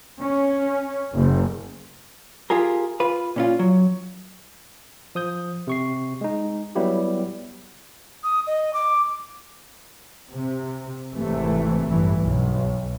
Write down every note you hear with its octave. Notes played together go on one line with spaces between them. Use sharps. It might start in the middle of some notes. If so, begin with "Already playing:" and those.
C#4
F#1
F4 G4 G#4 A#4
F4 B4
A#2 C#4 F4
F#3
F3 D#6 G6
C3 C#6 C7
G#3 D#4
F#3 G3 B3 E4 G4
D#6
D#5
D6
C3
G#1 C3 E3 A3
A1 G2 E3
B1